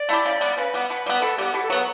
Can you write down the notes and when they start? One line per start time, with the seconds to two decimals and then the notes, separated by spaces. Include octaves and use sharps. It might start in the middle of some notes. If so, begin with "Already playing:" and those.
Already playing: D5
0.09 A3 E4 G4
0.26 C#3
0.41 G3 B3
0.58 C#3 B4
0.74 G3 B3
0.90 B2
1.06 G3 B3
1.22 B2 A4
1.38 G3 B3 G4
1.54 B2 G4
1.63 A4
1.70 F#3 B3 B4